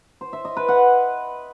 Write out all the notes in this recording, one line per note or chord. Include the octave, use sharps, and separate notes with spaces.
C5
E5
D#5
B4
F#5